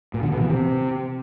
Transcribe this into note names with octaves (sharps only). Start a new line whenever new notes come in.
A#2
D3
B2
E3
C3